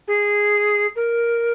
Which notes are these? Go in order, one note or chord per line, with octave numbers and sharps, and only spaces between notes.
G#4
A#4